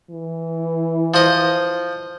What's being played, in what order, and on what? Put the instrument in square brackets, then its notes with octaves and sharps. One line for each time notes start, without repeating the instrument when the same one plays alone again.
[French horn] E3
[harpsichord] F3 D#5